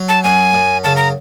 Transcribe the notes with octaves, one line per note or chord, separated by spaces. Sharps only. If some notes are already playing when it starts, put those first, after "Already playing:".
Already playing: F#3
A5
F#2 G#5
F#2
C#3 A5
A#5